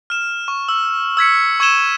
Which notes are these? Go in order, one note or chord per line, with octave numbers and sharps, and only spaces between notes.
F6 E7
C#6
E6
E6 G#6 B6 C#7
C#6 E6 G#6 D#7 E7 G7